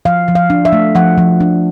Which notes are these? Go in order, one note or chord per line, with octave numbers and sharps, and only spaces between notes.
F3 F5
F3
F5
D4
E5
A3
F3 F#5
F3
D4